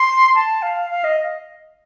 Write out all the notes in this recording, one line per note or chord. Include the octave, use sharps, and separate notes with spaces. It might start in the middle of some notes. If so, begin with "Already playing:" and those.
Already playing: C6
A5
F5
F5
D#5